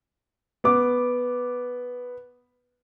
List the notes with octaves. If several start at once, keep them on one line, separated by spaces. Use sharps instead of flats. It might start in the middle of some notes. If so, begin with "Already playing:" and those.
B3 D6